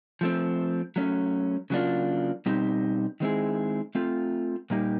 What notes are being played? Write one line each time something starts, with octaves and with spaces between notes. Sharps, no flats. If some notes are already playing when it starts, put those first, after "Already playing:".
F3 A3 C4
F#3 A3 C#4
C#3 F#3 A#3 D4 F4
B2 G3 C4 D#4 G4
D#3 G#3 C4 E4 G#4
A3 C4 F4 A4
A#2 G3 A#3 D#4 G4